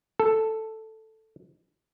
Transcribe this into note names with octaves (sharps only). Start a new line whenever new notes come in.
A4